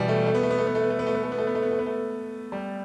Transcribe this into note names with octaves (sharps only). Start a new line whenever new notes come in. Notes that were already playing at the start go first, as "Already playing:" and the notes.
Already playing: B2 E3 G3
A3
A3
B3
A3
B3
A3
B3
A3
B3
A3
B3
A3
B3
A3
B3
A3
B3
A3
B3
A3
B3
A3
G3